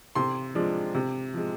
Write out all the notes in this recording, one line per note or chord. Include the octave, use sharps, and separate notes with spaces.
C3 C6
F3 G#3 D4
C3
F3 G#3